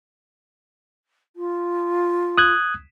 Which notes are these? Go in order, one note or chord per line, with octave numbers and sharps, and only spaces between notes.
F4
D#6 F#6 G#6